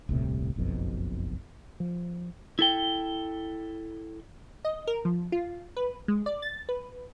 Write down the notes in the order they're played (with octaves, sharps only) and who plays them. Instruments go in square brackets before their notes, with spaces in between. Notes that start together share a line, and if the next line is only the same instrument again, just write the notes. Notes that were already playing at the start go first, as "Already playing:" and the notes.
[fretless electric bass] D#1 C2 A2 C3
F#1 B1 F2 B2
F3
[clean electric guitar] E4 A4 G5
[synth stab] D#5
A#4
F3
F4
B4
G#3
D5
A6
B4